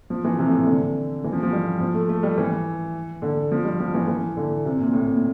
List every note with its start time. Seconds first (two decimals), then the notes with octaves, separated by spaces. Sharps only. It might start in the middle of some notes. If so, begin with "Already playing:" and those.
0.10 F3
0.25 E3
0.39 C3
0.48 A2
0.58 A#2
0.66 D3
1.24 E3
1.33 F3
1.43 F3
1.52 G3
1.81 F3
1.94 A3
2.09 A3
2.23 G3
2.38 E3
3.22 D3
3.52 F3
3.65 G3
3.80 F3
3.94 E3
4.08 E3
4.37 D3
4.65 C3
4.79 A#2
4.93 A2
5.08 A#2